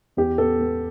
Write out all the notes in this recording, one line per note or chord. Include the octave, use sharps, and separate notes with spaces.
E2 G4
B3 A4
B3